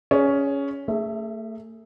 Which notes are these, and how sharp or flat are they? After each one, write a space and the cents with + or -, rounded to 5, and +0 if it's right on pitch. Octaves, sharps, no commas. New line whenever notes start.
C#4 +10 G#4 +0
A3 +35 G#4 +0 E5 +0